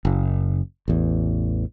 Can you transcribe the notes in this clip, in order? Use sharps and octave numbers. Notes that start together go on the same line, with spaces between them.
F#1
A1 E2